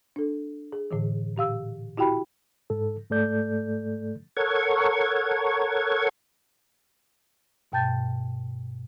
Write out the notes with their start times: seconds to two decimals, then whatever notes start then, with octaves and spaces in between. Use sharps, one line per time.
0.16 D4 A4
0.72 G#4
0.91 A2 D3 E3
1.36 A#2 G4 F5 E6
1.97 E4 F#4 G4 G5 B5
2.70 G#2 A4
3.10 G#2 A3 A4 D5 G6
4.37 A4 A#4 C#5 F#5 C#6 G#6
7.72 G2 B2 G5 A5 G6 A6